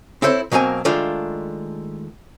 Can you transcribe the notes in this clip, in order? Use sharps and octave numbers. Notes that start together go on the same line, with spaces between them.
C4 E4 A4 C5 C#5
B2 F#3 A#3 C4 G#5
D#3 G#3 A3 D4 F4